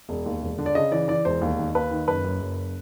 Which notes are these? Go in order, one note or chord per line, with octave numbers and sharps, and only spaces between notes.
E1
D#2
E1
D3
D5
C#3 D#5
E3 D5
E3 D5
E1 C5
D#2
D#3
D#2 B4
D#3
F#1 B4
F#2
F#1